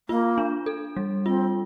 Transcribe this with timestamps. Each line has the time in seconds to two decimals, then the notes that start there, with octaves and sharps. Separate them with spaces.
0.09 A#3 F4
0.38 D4
0.66 A4
0.97 G3
1.25 C4 F4